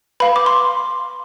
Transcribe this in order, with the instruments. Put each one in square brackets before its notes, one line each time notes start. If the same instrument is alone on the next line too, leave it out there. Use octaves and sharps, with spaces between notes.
[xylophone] B4 F5 B5
D6
C6